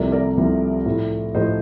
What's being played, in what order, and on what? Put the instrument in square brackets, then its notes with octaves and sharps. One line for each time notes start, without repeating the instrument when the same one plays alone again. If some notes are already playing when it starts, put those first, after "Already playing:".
Already playing: [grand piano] C2 C3 F3 A3 A#4 D5
A#4 D5
C2 C3 F3 A3
A2 F3 A3
A2 F3 A3 C5 D#5